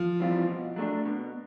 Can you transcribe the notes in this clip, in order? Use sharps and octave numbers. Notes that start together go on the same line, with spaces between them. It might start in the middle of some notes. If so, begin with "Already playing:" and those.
Already playing: F3
E3 G3 C4 F4
B2
F#3 A3 D4
B2